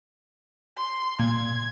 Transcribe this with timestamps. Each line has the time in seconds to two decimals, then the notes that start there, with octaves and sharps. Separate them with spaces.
0.77 C6
1.19 A#2 G#6